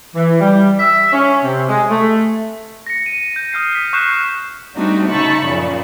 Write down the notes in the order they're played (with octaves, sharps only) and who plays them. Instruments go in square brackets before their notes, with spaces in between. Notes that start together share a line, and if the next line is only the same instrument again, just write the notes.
[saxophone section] E3
G3
E5
C#4
C3
G#3
A3
[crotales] A#6 C#7
D#7
G6
D#6 F6 G6 C7
B6
C#6 D#6 F#6 G6 C7 E7
[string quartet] G3 A3 C4 D4 D#4 F#4
C#3 D#4 E5 A5 B5 C#6
F#2 A#2 C#3 F3